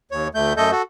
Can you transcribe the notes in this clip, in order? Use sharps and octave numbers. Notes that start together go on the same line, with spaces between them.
D#2 C#5
D2 A3 G6
F#2 A3 A4 D#5 G6
F#4 A4